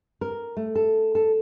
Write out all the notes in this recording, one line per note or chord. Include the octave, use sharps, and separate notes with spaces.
A#4
A3
A4
A4